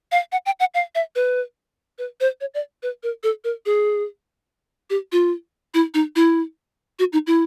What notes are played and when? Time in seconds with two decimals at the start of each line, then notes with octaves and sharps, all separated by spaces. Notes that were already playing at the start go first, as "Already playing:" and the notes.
0.12 F5
0.32 F#5
0.46 G5
0.60 F#5
0.74 F5
0.95 E5
1.15 B4
1.98 B4
2.20 C5
2.41 C#5
2.54 D5
2.83 B4
3.03 A#4
3.23 A4
3.44 A#4
3.66 G#4
4.90 G4
5.12 F4
5.74 E4
5.94 D#4
6.16 E4
6.99 F#4
7.13 D#4
7.27 E4